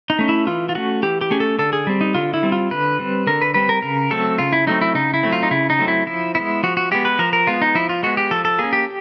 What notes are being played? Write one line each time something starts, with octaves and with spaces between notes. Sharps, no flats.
D#4
A3 C#4
E4
E3 F4
F4
A3 C#4 F#4
E3 G4
G4
A3 C#4 G#4
A4
D3 A4
G#4
G3 C4
D#4
D3 F4
E4
G3 C4
F4
D3 B4
G3 C4
D3 A#4
B4
G3 C4 B4
A#4
C#3 A#4
F#3 A3 C4 A4
C#3 F4
E4
F#3 A3 C4 D#4
E4
C#3 D#4
E4
F#3 A3 C4
F4
D#4
C#3 E4
D#4
F#3 A3 C4
E4
F3 E4
G#3 B3 E4
F3 F#4
F#4
G#3 B3 G4
B4
F3 A#4
A#4
G#3 B3 F4
D#4
F3 E4
F4
G#3 B3 F#4
G4
F3 A4
A4
A#3 C#4 G#4
G4